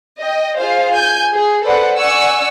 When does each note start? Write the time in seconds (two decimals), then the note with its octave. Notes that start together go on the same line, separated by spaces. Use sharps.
0.22 D#5 G5
0.58 F4 G#4 C5 F5
0.95 G#5 G6
1.33 G#4
1.64 A4 B4 C5 D5 F#5
1.98 D5 F#5 G#5 C#6 E6